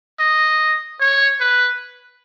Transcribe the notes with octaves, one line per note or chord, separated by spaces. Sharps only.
D#5
C#5
B4